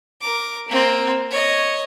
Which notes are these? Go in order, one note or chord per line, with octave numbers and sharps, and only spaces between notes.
A#4 D6
A#3 C4
C#5 D#5